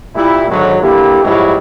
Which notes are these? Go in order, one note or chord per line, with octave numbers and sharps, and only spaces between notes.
A#2 G3 E4
G#1 D3 F#3
D3 A#3 E4 G4
A#1 G#2 F#3 G3 E4